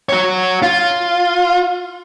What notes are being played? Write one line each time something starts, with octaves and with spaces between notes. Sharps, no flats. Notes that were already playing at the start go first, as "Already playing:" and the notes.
F#4 C#5
F4